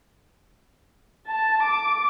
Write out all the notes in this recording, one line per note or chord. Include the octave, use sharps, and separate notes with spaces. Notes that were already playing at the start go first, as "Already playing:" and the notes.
A5
D6